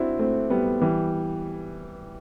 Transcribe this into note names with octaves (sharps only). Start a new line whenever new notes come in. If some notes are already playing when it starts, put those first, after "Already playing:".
Already playing: C4 D4 E4 F#4
A3 C4
G3 B3
E3 G3